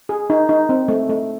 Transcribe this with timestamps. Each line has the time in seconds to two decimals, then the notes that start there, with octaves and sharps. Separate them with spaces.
0.09 G#4
0.30 D#4
0.49 D#4
0.69 C4
0.88 A3
1.09 A3